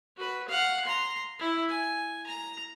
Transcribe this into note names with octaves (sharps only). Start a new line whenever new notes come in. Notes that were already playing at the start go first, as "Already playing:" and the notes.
F#4 B4
F5 F#5
A#5 C6
E4
G#5
A#5